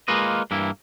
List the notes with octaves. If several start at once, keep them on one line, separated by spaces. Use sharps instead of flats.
G#3 A#3 F4 B4 D#5
G2 E3 A#3 E4